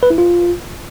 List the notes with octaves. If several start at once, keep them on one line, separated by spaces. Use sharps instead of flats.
B4
E4
F4